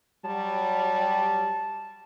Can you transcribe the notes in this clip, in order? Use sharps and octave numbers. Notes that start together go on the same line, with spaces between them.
F#3 G3 A5